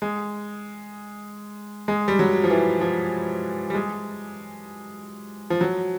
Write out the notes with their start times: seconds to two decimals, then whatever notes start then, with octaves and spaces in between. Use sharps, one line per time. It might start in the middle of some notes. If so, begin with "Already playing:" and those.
0.02 G#3
1.88 G#3
2.08 G3
2.19 F#3
2.44 F3
2.50 E3
2.81 F3
3.70 G3
3.74 G#3
5.50 F3
5.61 F#3